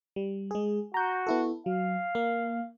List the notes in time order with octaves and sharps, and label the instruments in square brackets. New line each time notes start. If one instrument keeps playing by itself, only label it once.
[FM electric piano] G3
G#3 G#4
[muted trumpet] F#4 [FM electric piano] A#5 G6
[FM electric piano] B3 E4 A4
[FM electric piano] F#3 [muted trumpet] F5
[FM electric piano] A#3